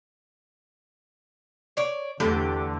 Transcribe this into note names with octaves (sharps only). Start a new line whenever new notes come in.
C#5 D5
E2 D3 A3 G4